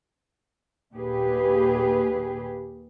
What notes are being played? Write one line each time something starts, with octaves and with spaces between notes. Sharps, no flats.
D#2 A#2 G4 G#4 B4